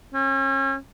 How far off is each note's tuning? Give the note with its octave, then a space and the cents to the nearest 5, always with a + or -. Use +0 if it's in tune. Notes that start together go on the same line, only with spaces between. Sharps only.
C#4 -35